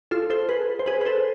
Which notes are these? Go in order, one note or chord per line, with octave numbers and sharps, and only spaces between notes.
F4 A4
A4 C5
G#4 B4
C5
G#4 B4
B4
A4 C5